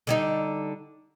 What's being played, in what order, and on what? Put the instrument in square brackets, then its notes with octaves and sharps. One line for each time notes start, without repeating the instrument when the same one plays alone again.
[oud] D3 G3 D#4